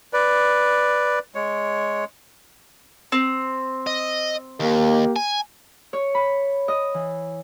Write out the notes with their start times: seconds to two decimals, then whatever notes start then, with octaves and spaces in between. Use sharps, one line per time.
0.13 B4 D5
1.35 G#3 C#5
3.12 C4
3.87 D#5
4.60 D#2 A#3 G4
5.16 G#5
5.93 C#5
6.14 B5
6.68 D#5
6.94 E3